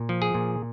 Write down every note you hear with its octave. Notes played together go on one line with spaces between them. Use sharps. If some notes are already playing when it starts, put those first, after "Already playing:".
Already playing: A#2
F3
G#4
A#2